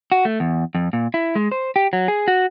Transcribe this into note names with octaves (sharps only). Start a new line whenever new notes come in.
F#4
A3
E2
F2
A#2
E4
G#3
C5
G4
F#3
G#4
F#4